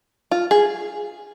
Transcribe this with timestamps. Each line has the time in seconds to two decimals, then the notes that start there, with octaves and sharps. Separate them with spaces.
0.31 F4
0.51 G#4